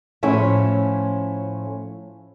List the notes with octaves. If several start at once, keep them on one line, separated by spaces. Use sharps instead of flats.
A2 F3 C#4 E4 G#4 E5